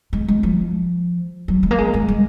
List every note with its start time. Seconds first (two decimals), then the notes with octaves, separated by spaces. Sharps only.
0.13 G#3
0.28 G#3
0.43 F3
1.48 F#3
1.63 G#3
1.71 A#3
1.78 G#3
1.94 G#3
2.08 G#3